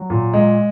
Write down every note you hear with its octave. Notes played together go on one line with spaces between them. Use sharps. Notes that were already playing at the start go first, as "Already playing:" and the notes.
Already playing: F#3
A#2
G#3